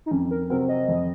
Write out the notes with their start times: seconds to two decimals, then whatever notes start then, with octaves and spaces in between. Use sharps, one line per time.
0.06 D#4
0.11 F2 C#4
0.31 A#4
0.50 C3 F#3 C4 F#4 A#4
0.69 D#5
0.88 F2